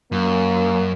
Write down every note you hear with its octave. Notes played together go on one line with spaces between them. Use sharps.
F#2 A#3